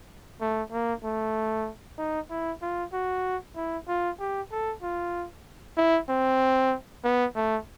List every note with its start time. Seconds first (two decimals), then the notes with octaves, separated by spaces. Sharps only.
0.41 A3
0.72 A#3
1.04 A3
1.98 D#4
2.30 E4
2.62 F4
2.93 F#4
3.56 E4
3.88 F4
4.19 G4
4.52 A4
4.82 F4
5.77 E4
6.09 C4
7.04 B3
7.35 A3